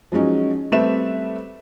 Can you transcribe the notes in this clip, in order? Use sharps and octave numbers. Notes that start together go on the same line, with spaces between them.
F3 F#3 G#3 C#4 D#4
G3 A3 C4 B4 E5 E7